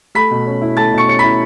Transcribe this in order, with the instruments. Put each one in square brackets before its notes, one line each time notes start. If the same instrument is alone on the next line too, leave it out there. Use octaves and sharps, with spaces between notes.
[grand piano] A3 B5 B6
B2
C#4
E4
A3 A5 A6
B2
C#6 C#7
C#4 C#7
E4 B5 B6